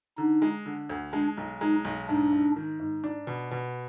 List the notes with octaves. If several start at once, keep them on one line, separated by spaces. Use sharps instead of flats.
D3 D#4
G#3
D3
D2
G#3 D4
B1
G#3 D#4
B1
G#2 D4
G#2
D#3
G#2
D4
B2
B2